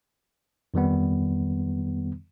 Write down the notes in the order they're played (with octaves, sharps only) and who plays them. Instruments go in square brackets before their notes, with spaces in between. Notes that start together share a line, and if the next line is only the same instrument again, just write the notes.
[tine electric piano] F2 D#3 G3 B3